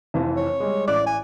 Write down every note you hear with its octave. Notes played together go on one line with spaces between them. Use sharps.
F1 F2 E3
C#5
G3 G#3
A1 D5 D6 F#6
G#5